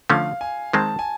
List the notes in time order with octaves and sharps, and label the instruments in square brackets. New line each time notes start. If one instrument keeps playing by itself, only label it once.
[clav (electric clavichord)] D3 F3 A3 C#4 [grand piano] F5
[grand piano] G#5
[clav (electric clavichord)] D#3 G#3 C4 [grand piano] A5
[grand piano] G#5